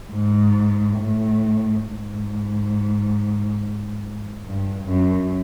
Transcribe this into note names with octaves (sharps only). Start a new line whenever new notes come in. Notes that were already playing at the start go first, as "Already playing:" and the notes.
G#2
A2
G#2
G2
F#2